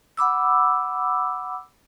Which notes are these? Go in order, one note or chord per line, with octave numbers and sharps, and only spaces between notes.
F#5 B5 D6 E6